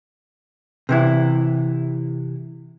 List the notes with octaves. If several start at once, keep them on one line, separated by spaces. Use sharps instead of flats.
C3 E3 E4